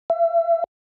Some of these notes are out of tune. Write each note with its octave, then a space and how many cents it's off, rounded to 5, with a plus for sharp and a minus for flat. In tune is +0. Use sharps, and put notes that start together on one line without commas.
E5 +35